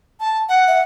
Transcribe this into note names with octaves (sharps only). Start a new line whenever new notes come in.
A5
F#5
E5